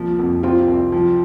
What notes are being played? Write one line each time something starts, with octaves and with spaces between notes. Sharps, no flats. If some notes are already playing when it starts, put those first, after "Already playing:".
Already playing: C2 F3 A#3
F2
C3 C4 F4
C2
F3